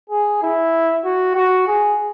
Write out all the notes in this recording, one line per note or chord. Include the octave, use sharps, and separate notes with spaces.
G#4
E4
F#4
F#4
G#4